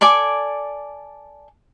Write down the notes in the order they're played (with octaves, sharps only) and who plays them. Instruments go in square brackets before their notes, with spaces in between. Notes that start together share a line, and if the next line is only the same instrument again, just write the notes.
[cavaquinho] A4 D5 G#5 D6